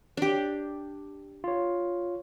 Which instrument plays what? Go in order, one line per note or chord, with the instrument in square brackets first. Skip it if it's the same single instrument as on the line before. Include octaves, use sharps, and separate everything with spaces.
[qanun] D4 G4
[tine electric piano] F4 C#5